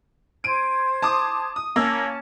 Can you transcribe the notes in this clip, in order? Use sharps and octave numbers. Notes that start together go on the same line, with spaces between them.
C5 G#6 D7 D#7
A5 D6 D#6
D#6
A#3 C#4 A5 E6